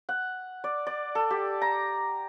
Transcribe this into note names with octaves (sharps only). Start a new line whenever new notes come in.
F#5
D5
D5
A4
G4
A#5